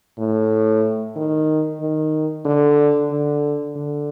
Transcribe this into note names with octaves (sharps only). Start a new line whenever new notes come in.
A2
D#3
D#3
D3
D3
D3